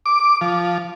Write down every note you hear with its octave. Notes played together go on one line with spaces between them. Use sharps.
D6
F3